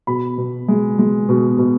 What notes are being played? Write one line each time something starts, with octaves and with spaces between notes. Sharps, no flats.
B2 B5
B2
G#3
G#3
B2
B2